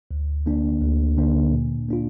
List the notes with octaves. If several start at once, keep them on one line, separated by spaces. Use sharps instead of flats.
D2
D3 A#3 D4
D2
D3 A#3 D4
A#2
A#3 D4 F4